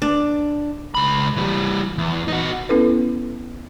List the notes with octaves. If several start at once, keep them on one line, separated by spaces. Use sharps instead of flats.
D4
C#2 B5
E3 G3
E2
D#4 F#4
B3 C#4 E4 A4 B4